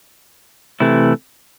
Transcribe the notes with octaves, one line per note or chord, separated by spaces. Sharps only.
C3 E3 A3 E4